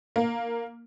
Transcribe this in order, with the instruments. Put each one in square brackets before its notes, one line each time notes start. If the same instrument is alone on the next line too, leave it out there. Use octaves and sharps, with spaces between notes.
[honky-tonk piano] A#3